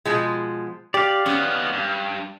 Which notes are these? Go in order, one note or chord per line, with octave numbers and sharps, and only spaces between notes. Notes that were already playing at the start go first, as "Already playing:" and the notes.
B2 F3 G#3
G4 D5 F5
D#3 B3 C#4
G2